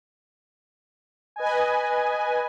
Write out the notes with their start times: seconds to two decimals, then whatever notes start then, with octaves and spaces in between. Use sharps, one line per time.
1.36 B4 D#5 G#5